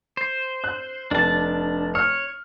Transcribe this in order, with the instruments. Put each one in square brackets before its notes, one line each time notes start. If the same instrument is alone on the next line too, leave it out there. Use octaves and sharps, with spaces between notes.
[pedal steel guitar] C5
[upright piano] F#6
[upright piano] F1 [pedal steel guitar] D4 A5
[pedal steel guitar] C#5 [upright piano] F6